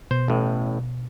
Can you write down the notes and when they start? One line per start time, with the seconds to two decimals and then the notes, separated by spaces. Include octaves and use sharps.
0.11 B2 C5
0.28 A1 A2